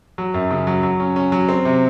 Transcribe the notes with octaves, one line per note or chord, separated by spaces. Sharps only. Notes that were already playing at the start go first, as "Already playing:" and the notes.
F#3
F#2
C#3
F#3
F#3
C#4
C#4
F#3
C4
C3